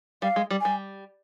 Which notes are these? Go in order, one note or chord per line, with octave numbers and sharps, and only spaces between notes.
G3 F5
G#3
G3
G3 G#5